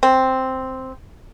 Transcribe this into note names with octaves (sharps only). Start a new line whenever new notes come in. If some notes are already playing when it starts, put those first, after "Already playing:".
C4